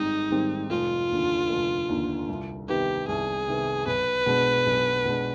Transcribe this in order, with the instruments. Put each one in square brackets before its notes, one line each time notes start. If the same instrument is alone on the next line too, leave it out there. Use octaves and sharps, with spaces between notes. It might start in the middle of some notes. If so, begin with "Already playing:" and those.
Already playing: [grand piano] G#1 G#2 D#3 G3 C4 [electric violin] D#4
[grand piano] G#2 D#3 G3 C4
[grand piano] F1 [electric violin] F4
[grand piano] D#2 D3
F1
D#2 D3
C2
[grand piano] C3 D#3 B3 [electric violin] G4
[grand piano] C2 [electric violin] G#4
[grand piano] C3 D#3 B3
[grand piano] B1 [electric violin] B4
[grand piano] B2 G#3 D4
B1
B2 G#3 D4